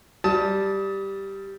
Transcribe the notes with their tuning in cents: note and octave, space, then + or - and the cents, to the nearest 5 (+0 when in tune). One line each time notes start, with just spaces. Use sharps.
G3 +0 A5 +0 D#6 +35